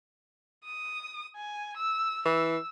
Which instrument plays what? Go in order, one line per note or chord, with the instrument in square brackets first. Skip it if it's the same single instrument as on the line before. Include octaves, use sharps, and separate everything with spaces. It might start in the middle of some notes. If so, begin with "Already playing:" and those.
[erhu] D#6
G#5
E6
[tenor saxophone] E3 [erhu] E6